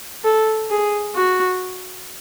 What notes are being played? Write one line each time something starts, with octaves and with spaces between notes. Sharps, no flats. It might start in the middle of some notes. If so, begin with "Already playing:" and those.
A4
G#4
F#4